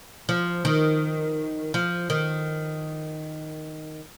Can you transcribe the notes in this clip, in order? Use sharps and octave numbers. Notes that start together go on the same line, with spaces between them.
F3
D#3
F3
D#3